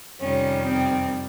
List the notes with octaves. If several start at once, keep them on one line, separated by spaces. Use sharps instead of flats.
F2 C3 D#3 G3 C#4
C4